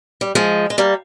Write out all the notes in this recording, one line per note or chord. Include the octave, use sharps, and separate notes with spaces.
G3
F3 G#3
G#3
G3 A#3